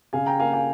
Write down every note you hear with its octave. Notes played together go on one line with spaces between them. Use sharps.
C#3 F5 G#5
G5 A#5
A#3 F5 G#5
F5 G#5